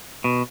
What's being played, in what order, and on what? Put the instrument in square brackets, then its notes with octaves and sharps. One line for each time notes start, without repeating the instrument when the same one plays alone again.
[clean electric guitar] B2